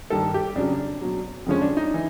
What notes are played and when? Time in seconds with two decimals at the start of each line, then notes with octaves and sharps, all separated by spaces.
0.10 G2 D#3 G3 A4
0.34 G4
0.56 F2 C#3 F#3 D4
1.01 B2 F#3
1.46 F2 D3 F3 G#3 C#4
1.61 D4
1.77 D#4
1.94 E3